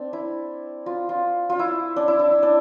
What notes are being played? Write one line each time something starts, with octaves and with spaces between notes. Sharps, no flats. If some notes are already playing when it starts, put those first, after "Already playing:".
Already playing: C4 D4
E4
F4
F4
F4
E4
D4
E4
D4
E4
D4